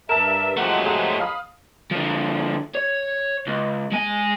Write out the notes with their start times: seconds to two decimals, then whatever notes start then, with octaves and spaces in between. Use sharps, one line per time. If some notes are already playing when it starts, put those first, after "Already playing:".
0.09 G2 A#4 E5 A5 E7
0.57 F3 F#3 G#3 A3 G4 F#5
0.86 G#4 F#5
1.20 F5 B5 D#6
1.92 D3 F3
2.75 C#5
3.47 C#2
3.92 G#3 G#5